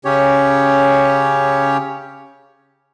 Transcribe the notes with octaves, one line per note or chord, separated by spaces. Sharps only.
C#3 C#4 G4 C#5